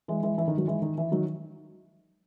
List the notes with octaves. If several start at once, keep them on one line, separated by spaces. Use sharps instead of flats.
E3 G#3
E3 G#3
E3
D#3
D#3 F#3
E3 G#3
D#3
E3
D#3 F#3